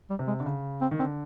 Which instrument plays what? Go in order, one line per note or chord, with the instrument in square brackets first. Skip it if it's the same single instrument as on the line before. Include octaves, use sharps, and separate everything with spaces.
[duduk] G3
[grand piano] C3
[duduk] G#3
[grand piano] D3
C#3
[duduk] C4
[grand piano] D#3
[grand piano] D3 [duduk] C4